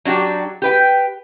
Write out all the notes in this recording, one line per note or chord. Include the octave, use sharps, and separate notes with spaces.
F#3 D4 F#4 G4
G4 B4 G5